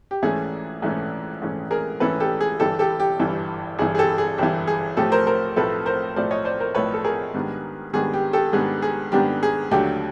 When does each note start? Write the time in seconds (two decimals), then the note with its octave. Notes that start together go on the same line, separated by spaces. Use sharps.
0.11 G4
0.22 A#1 G#2 E3 A3 C#4 G#4
0.82 A#1 G#2 E3 A3 C#4
1.42 A#1 G#2 E3 A3 C#4
1.71 G#4 A#4
2.00 A#1 G#2 E3 A3 C#4 A4 B4
2.20 G4 A4
2.41 G#4
2.59 G1 G2 E3 G4 A4
2.79 G4 A4
3.00 G4
3.19 G1 G2 E3
3.79 G1 G2 E3 G#4
3.95 G#4
3.98 G4 A4
4.18 G#4
4.38 G1 G2 E3 G4
4.67 G#4
4.97 B1 A2 F3 A3 G4 A4
5.12 A#4 C5
5.27 A#4 C5
5.56 B1 A2 F3 A3 A4 B4
5.86 A#4 C5
6.16 B1 A2 F3 A3 C5 D5
6.31 C#5 D#5
6.45 C5 D5
6.60 A#4 C5
6.75 B1 A2 F3 A3 B4 C#5
6.94 A4
7.04 G#4 A#4
7.34 G#2 D#3 G3 B3 D4
7.93 G#2 D#3 G3 B3 D4 G#4
8.13 G4
8.33 G4 A4
8.53 G#2 D#3 G3 B3 D4 G#4
8.82 G#4
9.12 G#2 D#3 G3 B3 D4 G4
9.43 G#4
9.71 D#2 D3 F#3 A3 D4 G4